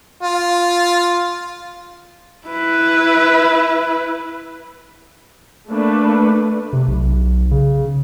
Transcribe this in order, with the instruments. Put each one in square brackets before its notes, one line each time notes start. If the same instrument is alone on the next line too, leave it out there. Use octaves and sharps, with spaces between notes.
[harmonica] F4
[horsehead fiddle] E4 B4
[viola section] A3 A#3 D4 B4
[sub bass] C3
B1
C#3